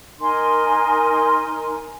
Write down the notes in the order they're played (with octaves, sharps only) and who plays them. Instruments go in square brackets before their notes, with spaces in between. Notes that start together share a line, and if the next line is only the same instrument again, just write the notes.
[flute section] D#4 A#4 G#5 C6